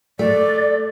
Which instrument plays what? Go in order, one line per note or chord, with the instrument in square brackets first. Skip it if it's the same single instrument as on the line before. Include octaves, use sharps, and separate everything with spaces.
[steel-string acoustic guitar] A3 [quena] D5